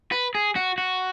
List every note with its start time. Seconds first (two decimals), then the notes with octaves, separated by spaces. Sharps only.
0.12 B4
0.35 G#4
0.56 F#4
0.78 F#4